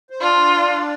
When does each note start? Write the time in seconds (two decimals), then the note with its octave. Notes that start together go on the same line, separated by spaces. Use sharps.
0.10 C5
0.21 D4 F4 D5